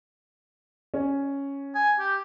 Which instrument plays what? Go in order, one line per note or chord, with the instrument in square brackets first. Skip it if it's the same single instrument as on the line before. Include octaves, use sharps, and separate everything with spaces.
[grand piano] C#4
[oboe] G#5
G4